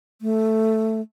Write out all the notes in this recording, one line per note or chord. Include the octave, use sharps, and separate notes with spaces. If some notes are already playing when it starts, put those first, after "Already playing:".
A3